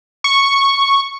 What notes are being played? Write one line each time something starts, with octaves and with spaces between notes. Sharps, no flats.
C#6